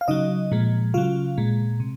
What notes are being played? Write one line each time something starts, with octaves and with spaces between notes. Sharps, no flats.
F5
C#3 F#3 D#4 D#5
A#2 F3 G#3
C#3 F#3 F4 F5
A#2 G#3
C3